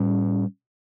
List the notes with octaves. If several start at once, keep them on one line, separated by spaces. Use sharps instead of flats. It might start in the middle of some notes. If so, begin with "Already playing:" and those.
Already playing: A2 G3 C#4